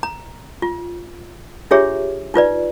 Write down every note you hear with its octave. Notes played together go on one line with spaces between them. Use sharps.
A#5
F4
D4 F4 G4 G#4 C#5 E5
D#4 F4 B4 D5